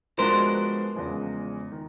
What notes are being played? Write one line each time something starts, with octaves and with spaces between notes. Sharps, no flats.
F3 G#3 B3 D4 F#4 A#4 C5
E2 C#3 F3 G#3
D#3